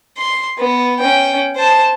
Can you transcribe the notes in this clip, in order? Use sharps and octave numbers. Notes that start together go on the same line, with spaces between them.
C6
B3
C#4 G5
C5 A5